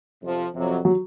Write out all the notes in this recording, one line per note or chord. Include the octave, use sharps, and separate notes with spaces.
F2 C3 F3
F2 C3 F#3
F#3